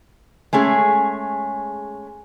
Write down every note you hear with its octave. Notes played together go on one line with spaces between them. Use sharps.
G#3 A3 C#4 G#4